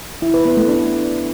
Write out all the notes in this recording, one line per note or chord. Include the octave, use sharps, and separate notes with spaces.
E4
B4
B3
A3
D4